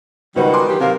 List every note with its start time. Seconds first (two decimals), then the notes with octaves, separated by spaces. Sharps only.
0.36 C#2 D#3 G3 D#4 F#4 B4 C5 F#5
0.53 G#5 C6 D6
0.68 E3 F#3 G4
0.80 C3 F#3 A#4 F5